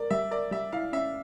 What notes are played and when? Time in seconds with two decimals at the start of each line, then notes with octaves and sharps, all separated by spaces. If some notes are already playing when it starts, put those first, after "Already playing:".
Already playing: A#4 D5
0.10 G3 E5
0.31 A#4 D5
0.51 G3 E5
0.73 E4 F5
0.93 C#4 E5